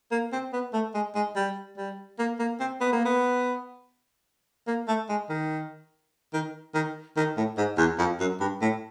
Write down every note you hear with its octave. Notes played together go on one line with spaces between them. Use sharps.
A#3
C4
B3
A3
G#3
G#3
G3
G3
A#3
A#3
C4
B3
A#3
B3
A#3
A3
G#3
D#3
D#3
D#3
D#3
A2
G#2
E2
F2
F#2
G2
A2